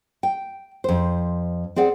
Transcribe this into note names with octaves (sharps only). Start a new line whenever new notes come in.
G5
F2 C5
C4 G#4 D5 F#5